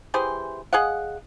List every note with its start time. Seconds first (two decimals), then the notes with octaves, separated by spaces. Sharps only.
0.14 E3 G4 G#4 C5
0.73 G#4 D#5 F5 F#5